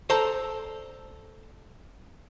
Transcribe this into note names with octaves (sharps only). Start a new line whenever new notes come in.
A4 C5 D5 A5 A#5